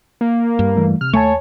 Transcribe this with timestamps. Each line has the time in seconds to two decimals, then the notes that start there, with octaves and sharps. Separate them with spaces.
0.21 A#3
0.59 G2
0.76 E3 G3 A3
1.01 C3 F6
1.13 D#2 A3 C#5 G#5 A5